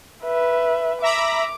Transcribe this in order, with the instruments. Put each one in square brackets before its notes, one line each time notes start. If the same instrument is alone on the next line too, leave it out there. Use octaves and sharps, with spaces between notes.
[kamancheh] B4 E5
[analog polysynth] E5 A#5 B5 [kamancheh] D6